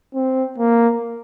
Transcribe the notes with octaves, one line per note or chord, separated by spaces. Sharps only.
C4
A#3